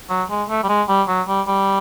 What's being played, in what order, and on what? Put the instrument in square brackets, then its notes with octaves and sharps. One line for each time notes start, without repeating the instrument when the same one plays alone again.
[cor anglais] F#3
G#3
A3
G3
G#3
G3
F#3
G3
G3